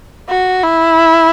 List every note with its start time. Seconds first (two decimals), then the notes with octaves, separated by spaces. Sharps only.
0.29 F#4
0.63 E4